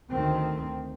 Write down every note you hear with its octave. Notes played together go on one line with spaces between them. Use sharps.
D2 D#3 A3 C4